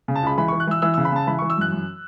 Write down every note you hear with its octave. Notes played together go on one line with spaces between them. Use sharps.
C#3
A5
C#2 B5
E3 B5
E3 C#6
F#6
E3 E6
E3 E6
C#3 E6
B5
C#3 A5
E3 B5
E3 C#6
E6
F#2 F#6
F#2